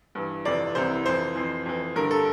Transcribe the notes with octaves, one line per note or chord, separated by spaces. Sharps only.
G2 E3
F2 C3 E3 D5
C2 C3 E3 C5
F2 E3 C5
F2 E3
F2 E3
G2 D3 A#4
A4